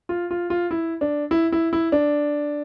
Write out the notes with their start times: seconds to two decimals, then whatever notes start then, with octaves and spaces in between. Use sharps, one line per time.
0.09 F4
0.31 F4
0.50 F4
0.71 E4
1.01 D4
1.31 E4
1.52 E4
1.73 E4
1.92 D4